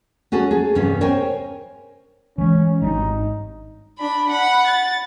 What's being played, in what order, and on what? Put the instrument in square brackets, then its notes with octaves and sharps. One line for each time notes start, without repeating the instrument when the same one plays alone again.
[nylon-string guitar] C#4 F#4 G#4 A4
G#4 A4
E2 G2 C3 B3 C#4
A#4 C5 C#5 G5 G#5
[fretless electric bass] E3 G#3 [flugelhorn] C#4
[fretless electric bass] G#1 G3 D4 [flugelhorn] D#4
[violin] D4 B5
F#5 B5
A6